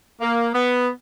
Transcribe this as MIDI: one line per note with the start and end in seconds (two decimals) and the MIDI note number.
0.21 0.48 58
0.54 0.88 59